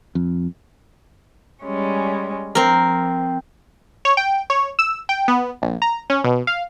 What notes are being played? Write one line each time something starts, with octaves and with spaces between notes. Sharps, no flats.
F2
G3 G#3 C#4
F3 C4 A#4
C#5
G5
C#5
E6
G5
B3
A#1
A#5
C#4
B2
F5